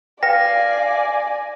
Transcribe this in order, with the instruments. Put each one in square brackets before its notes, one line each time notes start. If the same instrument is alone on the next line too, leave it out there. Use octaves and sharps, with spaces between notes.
[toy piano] B4 G5 [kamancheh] D5 G#5 [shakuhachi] F5 [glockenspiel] A#6